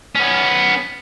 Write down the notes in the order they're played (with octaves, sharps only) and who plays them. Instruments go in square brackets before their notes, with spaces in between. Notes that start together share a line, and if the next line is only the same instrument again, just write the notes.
[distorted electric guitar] B3 C#4